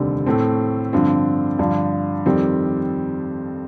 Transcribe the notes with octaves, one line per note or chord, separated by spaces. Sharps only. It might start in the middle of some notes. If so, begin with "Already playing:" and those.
Already playing: F1 D#2 D3 G3 C4
A2 A3 C4
G2 D3 F3 C4
G2 D3 F3
F2 D#3 G3 C4